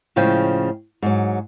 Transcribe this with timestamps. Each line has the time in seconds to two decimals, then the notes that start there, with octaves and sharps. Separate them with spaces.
0.16 A2 C#3 F3 G#3 G5
1.02 G#2 F#3